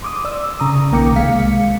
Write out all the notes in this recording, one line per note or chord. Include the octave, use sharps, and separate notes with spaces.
C6 D6 D#6
D5 E6
C#3 A#5 D#6
B1 D#3 A#3 G5 D6 C#7
C2 G#3 F5 B6 C#7